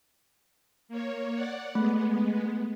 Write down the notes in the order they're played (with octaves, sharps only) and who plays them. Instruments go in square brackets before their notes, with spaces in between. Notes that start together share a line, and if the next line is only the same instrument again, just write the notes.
[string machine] A#3 C#5
D5 F#5
[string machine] G#3 B3 [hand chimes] A3